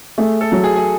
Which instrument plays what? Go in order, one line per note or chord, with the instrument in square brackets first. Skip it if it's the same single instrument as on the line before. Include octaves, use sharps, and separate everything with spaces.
[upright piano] A3 [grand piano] G#4
[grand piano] A4
[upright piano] F#3
[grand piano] G#4
G#4